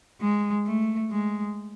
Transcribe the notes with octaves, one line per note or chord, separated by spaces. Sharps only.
G#3
A3
G#3